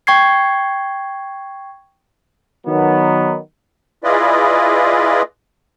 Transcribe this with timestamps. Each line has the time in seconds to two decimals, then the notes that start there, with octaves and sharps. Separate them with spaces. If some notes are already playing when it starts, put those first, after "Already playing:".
0.07 G5 C#6 G#6 C7
2.66 D#3 F#3 B3
4.04 E4 F4 G#4 B4 D5 D#5